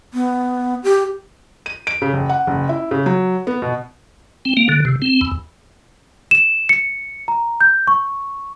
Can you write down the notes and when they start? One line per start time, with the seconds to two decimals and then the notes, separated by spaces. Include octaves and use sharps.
0.14 B3
0.84 G4
1.66 D#7
1.87 D7
2.02 C#3
2.13 F#1
2.29 F#5
2.47 F#1
2.69 E4
2.91 C#3
3.06 F#3
3.47 B3
3.62 B2
4.45 C4
4.57 A#3
4.69 D3
4.85 C3
5.02 C4
5.21 E2
6.31 E7
6.69 C#7
7.28 A#5
7.61 G6
7.87 C#6